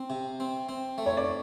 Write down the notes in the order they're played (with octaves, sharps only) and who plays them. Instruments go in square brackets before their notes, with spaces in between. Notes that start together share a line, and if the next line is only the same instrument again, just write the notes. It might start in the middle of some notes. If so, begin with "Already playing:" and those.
Already playing: [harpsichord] C4
C3
C4
C4
A3
[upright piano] C#5
D5